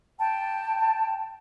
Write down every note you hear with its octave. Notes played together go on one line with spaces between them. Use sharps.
G5 A5